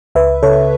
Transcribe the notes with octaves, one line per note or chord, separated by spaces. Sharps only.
C#2 B4 E5
C#3 A4 C#5